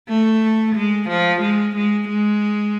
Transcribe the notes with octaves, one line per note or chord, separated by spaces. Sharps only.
A3
G#3
F3
G#3
G#3
G#3